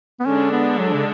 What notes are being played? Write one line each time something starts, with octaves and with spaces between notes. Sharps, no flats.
B3
D3 G#3 C#4 D4
B3
F#3
C#3